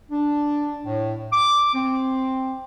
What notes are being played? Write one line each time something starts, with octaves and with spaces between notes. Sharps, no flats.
D4
A2
D6
C4